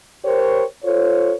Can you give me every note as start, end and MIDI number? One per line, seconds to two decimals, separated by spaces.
0.25 0.63 67
0.25 0.63 70
0.25 0.63 72
0.25 0.63 73
0.84 1.33 65
0.84 1.33 69
0.84 1.33 72
0.84 1.33 73